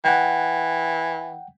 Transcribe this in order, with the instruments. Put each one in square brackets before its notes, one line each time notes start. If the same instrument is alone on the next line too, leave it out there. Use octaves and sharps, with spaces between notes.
[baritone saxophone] E3 [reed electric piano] F#5 G5